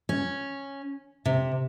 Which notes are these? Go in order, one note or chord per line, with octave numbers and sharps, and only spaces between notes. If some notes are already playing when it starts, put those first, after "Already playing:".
C#4
C3